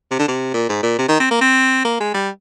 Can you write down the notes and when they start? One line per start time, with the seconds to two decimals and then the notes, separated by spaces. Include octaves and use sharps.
0.11 C3
0.19 D3
0.28 C3
0.54 A#2
0.69 G#2
0.83 A#2
0.99 C3
1.08 D#3
1.20 C4
1.31 A#3
1.41 C4
1.85 A#3
2.00 G#3
2.14 G3